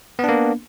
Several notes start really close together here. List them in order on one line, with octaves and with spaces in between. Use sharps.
B3 D4 A#3